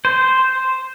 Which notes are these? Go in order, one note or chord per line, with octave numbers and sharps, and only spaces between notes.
C5